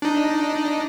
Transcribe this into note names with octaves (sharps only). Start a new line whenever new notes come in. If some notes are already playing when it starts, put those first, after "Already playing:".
D4 D#4